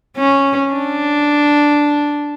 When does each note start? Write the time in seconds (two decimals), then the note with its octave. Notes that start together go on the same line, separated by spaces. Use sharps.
0.17 C#4
0.73 D4